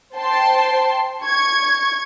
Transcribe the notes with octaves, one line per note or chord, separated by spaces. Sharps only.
C5 G5 A5 C6
C#6 G#6